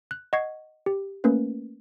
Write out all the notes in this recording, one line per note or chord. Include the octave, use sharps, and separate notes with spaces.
F#6
D#5 F#5 C#6 G#6 C7
G4
A3 A#3 C#4 A#4 B4